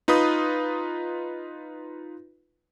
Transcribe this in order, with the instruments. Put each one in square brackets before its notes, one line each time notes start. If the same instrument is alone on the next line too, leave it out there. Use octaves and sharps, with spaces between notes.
[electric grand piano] D#4 F4 B4 B5 D#6